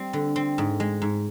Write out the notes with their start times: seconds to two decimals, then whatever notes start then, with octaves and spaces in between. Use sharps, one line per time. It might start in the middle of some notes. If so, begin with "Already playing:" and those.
Already playing: G3 C4
0.13 D3
0.36 C4
0.58 G#2
0.80 G#3
1.02 G#2